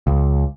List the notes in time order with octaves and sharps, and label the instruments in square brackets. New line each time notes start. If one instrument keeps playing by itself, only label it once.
[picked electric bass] C#2